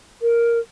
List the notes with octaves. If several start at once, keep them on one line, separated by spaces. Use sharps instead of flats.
A#4